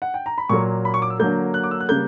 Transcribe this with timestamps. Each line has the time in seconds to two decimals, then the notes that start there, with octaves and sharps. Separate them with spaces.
0.02 F#5
0.14 G5
0.26 A#5
0.38 B5
0.49 A#2 F#3 A#3 C#6
0.85 B5
0.94 C#6
1.02 D6
1.10 E6
1.20 D3 F#3 A#3 G6
1.54 F#6
1.63 D6
1.71 E6
1.80 F#6
1.89 C#3 G3 A#3 G6